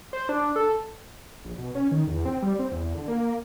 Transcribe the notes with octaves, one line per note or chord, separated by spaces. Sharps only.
C5
D4
A4
A#1
B2
C#4
D#3
E2
C4
G3
C4
E2
D3
A#3